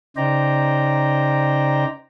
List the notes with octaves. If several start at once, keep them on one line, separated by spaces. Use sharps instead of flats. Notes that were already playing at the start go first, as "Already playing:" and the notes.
C#3 D#4 C5 D5 G5 A#5